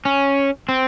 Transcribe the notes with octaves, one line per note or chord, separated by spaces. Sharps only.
C#4
C4